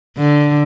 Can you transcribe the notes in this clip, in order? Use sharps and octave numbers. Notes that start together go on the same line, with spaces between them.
D3